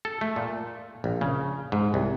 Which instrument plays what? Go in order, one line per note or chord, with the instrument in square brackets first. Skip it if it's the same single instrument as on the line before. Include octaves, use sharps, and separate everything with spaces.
[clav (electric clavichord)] A4
A3
A#2
A#1
C#3
G#2
C2